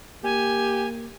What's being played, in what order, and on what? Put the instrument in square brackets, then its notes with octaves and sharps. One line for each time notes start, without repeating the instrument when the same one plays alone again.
[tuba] A#3 [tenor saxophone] G4 [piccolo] G#5